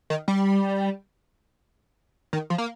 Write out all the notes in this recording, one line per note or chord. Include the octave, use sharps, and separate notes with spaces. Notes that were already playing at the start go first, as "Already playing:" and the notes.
D#3
G3
D#3
F3
A#3